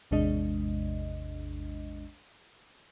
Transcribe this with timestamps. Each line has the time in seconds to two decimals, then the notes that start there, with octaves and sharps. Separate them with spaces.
0.11 A1 E2 C3 G#3 D4 D#5